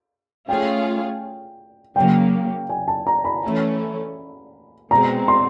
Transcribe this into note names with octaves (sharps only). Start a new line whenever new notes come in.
A3 C#4 F4 G#4 C#5 G5
C#3 F#3 A#3 G5
G#5
A5
A#5
B5
E3 A3 C#4
B2 G#3 C4 A#5
C6